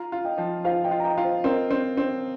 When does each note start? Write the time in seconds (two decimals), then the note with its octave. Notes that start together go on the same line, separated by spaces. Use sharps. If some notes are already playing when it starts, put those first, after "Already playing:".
Already playing: F4 F5 A#5
0.12 F4
0.25 D#5 G5
0.38 F3
0.65 F4 C5 F5
0.84 D#5 G5
0.91 F4
1.00 A#5
1.04 D#5 G5
1.17 F4 D#5
1.24 C5
1.44 C4 A#4 D#5
1.71 C4
1.97 C4